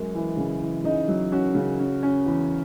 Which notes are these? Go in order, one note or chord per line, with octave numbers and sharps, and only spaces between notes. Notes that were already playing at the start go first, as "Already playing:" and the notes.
Already playing: F#2 G#3
E3
C#3
E3
C#3 D#4
F#3
C#4 F#4
C#3
C#4
C#4
E2